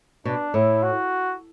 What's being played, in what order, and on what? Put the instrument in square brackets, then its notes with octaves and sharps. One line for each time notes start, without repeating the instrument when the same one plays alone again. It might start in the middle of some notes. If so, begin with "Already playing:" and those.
[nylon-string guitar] B2 [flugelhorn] D4
[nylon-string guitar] A2 [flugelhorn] E4
[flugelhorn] F#4